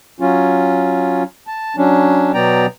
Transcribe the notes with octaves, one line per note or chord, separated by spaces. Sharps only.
F#3 C#4 F4
A5
F#3 C#4 D4
B2 F#3 B3 D5 G5 A#5